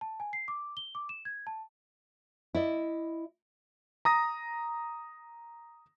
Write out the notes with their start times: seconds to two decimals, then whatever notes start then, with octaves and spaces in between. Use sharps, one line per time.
0.01 A5
0.20 G#5
0.33 C7
0.48 D6
0.77 G7
0.95 D6
1.09 E7
1.25 G#6
1.47 A5
2.55 E4 D5 D#5
4.05 A#5 D#6 A#6